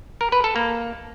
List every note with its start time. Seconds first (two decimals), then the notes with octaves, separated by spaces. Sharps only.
0.21 A#4
0.32 B4
0.44 A4
0.56 A#3